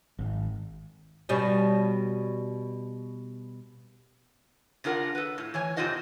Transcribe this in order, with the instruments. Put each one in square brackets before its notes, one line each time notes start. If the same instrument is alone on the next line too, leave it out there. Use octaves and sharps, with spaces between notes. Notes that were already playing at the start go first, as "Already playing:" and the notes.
[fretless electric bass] G#1
[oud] B2 G3 C#4
[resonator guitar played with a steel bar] C#3 D4 F4 A#4 F#5
A4 B4
A2
E3 C#5 G#5
F2 C3 F4 C5 D#5 F#5